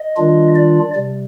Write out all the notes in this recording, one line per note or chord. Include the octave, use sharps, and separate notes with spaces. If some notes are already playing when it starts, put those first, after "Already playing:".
Already playing: D#5
D#3 G3 D4 F4
D5
C3 G3